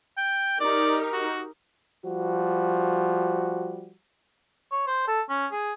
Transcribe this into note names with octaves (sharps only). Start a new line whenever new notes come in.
G5
D#4 G4 A#4 D5
F#4
F3 G3 F#4
C#5
C5
A4
C#4
G#4